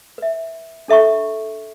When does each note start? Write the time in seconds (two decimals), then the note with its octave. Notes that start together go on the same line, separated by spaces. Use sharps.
0.18 B4 E5
0.88 D4 A4 E5 A#5 C#6